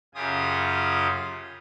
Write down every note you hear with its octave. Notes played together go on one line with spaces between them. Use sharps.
F#2 C#3 F4 G4 G#5 D#6